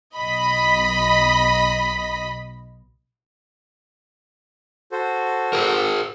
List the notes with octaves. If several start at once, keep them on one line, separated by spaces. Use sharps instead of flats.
B1 D#5 B5 B6
F#4 A4 C5
G#4 A#4